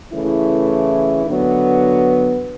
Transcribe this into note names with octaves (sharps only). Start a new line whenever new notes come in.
C#3 E3 A3 E4
D3 F#3 B3